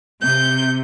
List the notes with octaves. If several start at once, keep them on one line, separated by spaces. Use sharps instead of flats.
C3 G6